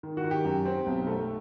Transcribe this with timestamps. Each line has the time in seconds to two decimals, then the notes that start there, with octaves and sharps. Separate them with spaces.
0.03 D#3
0.17 F#4
0.24 D#3
0.31 G4
0.45 F#2
0.65 C4
0.86 B1
1.07 A3